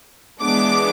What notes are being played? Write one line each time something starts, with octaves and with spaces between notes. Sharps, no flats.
E3 G#3 B3 D4 D6